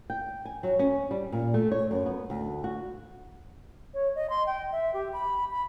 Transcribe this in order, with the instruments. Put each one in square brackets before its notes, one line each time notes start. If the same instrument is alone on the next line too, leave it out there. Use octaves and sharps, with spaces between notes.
[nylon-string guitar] G5
G#5
F#3
C#4
G3
A#2
A3
C#5
F#2
B3
D2
F#4
[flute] C#5
D#5
C6
G5
E5
G4
B5
B5